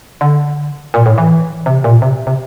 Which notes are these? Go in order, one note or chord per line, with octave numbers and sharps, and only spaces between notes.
D3
A#2
A2
E3
C3
A#2
C3
C3